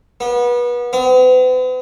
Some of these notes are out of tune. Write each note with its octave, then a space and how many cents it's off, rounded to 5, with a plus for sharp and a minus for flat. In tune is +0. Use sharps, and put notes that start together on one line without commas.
B3 -30
B3 +45